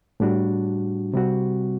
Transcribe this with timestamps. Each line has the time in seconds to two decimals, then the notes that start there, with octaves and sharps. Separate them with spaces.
0.20 A2 G3 D4 F#4
1.13 C3 G3 C4 F#4